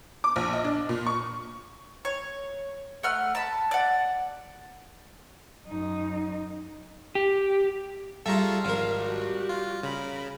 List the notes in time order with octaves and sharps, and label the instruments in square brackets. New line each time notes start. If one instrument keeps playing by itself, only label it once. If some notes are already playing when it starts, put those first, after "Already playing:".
[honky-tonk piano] D6
A#1
D#5
D4
A#2
C#6
[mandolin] C#5
A3 F#5 F6
A5 B5
D5 F#5
[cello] F#2 D#4
[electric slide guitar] G4
[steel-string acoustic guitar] G3 [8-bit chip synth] F4 A4 [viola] G#4 F5 [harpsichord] E5 A#5 C#6
[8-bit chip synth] G#1 [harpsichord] F3 A#4
[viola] F#4 G4
[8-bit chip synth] F4
[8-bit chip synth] C#3 [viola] A#4 B5